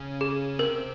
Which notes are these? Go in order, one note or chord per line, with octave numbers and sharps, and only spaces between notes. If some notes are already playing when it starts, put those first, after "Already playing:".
Already playing: C#3 C#4
G#4
C3 C4 A#4